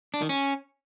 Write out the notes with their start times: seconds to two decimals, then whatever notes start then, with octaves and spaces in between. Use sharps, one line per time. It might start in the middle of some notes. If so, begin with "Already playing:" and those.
0.14 D4
0.21 D#3
0.29 C#4